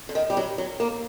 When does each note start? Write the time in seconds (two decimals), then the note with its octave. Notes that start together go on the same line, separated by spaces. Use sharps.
0.09 D3
0.15 D#3
0.30 G3
0.37 F#3
0.58 F#3
0.80 A#3